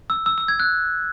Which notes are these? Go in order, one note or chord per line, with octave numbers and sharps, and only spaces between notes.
E6
E6
E6
G#6
F#6